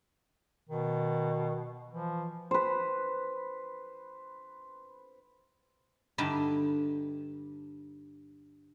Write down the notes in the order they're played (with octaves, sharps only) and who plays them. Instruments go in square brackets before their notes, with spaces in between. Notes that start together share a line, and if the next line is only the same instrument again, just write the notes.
[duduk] B2 [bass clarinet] D#3
[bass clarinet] E3 [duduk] F3
[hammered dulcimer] B4 C5
[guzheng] G2 D3 G3 D#4 E4 A5